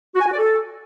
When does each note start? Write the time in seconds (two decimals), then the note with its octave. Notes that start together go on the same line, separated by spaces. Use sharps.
0.15 F#4
0.20 G#5
0.26 F#4
0.32 D5
0.38 A4